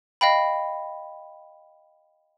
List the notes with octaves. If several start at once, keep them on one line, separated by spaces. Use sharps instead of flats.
D#5 F5 G5 B5